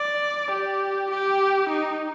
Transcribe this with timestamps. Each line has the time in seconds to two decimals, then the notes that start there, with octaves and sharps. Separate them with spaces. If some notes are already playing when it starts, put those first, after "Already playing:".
Already playing: D5
0.51 G4
1.10 G4
1.69 D#4